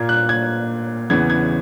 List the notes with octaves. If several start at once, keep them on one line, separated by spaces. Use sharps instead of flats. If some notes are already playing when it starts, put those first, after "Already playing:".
Already playing: A#2 A#3 G#6
F#6
G#6
E2 C#3 E3 B3 G#6
G#6